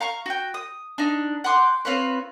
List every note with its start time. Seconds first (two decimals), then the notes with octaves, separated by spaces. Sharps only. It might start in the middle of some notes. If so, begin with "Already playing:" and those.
0.01 F5 A#5 C#6
0.26 F#4 G5
0.54 D#6
0.98 D4 D#4
1.44 F#5 G5 C6 D6
1.85 C4 F4 B4 C#5